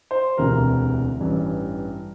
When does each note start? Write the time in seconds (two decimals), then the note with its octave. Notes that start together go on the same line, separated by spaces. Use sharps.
0.11 C5
0.37 E1 D2 C3 E3 A#4
1.20 A1 G2 E3